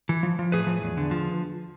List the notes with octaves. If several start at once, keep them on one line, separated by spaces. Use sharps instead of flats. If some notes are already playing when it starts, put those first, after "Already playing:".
E3
F3
F3
A2 G#4 B4
F3
E2
D3
F3